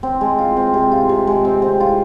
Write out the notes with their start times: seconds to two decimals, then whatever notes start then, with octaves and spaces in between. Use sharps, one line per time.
0.03 C4
0.21 G#3
0.38 F4
0.57 C4
0.74 C3
0.92 F4
1.09 C3
1.27 G#3
1.45 C4
1.62 C4
1.80 F4